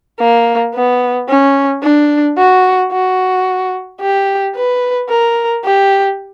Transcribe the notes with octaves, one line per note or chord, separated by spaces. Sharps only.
A#3
B3
C#4
D4
F#4
F#4
G4
B4
A#4
G4